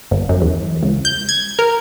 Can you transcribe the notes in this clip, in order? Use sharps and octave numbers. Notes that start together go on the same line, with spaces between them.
G1
F#2
E2
C#2
G6
G#6
A#4